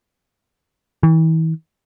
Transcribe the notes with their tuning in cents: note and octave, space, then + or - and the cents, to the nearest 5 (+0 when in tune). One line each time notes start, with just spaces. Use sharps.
E3 -40